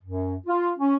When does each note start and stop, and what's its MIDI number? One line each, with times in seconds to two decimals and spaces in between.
0.03 0.35 42
0.47 0.69 65
0.77 0.95 61